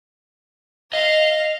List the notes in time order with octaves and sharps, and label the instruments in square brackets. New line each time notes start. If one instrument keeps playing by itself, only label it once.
[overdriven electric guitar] D#5 [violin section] F5